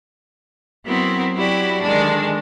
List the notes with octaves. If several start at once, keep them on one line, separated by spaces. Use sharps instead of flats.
F#3 B3 C4 E4 A#4
F#3 E4 F#4 G4 D5
D3 D#3 G#3 D4